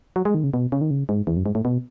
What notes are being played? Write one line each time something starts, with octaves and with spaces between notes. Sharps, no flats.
F#3
G#3
D#3
C#3
B2
C#3
D#3
C#3
G#2
E2
F#2
G#2
A2
B2